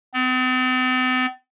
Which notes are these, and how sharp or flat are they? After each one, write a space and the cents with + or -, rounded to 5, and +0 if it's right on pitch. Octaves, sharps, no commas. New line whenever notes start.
C4 -45